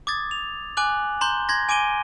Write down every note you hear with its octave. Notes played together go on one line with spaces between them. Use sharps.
D6 D#6 G#6 A6
F7
G#5 D6 F#6 F#7
A#5 C6 G6 G7
C6 G#6 A#6
G#5 D6 D7 D#7 G7